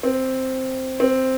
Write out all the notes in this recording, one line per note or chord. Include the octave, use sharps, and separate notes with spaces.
C4
C4